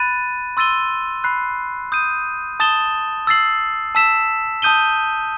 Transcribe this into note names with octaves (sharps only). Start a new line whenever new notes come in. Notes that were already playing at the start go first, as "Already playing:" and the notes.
Already playing: B5 F#6 A6 D#7
C6 E6 A6 D#7 G7
B5 F#6 C7
D#6 G6 D#7
A5 D#6 A6 E7 G7
E6 A6 C7 F#7
A5 E6 B6 E7
A5 D#6 G6 D#7 G7